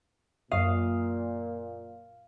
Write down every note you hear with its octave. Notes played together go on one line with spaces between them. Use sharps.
F#2 A#2 F#3 F5 D#6